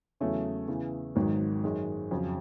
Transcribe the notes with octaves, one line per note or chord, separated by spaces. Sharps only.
E2 C#3 F#3 A3 C#4
E2 C#3 E3
G#1 G#2 D#3 F#3
F#2 D#3 G#3
F2 C#3 F#3